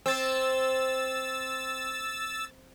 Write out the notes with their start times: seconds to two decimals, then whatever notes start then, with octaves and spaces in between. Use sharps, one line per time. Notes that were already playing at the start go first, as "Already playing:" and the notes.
0.06 C4 E6 A6